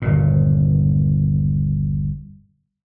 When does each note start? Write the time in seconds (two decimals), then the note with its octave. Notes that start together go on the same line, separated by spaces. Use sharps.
0.02 G1 D#2 A#2